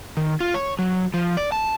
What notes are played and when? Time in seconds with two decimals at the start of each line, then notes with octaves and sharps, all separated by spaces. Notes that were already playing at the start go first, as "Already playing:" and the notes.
0.17 D#3
0.40 F4
0.54 C#5
0.79 F#3
1.14 F3
1.37 D5
1.52 A5